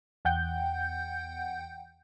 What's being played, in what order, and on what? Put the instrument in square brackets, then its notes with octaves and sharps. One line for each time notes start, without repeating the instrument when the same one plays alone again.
[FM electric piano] E2 F#5 G5 G6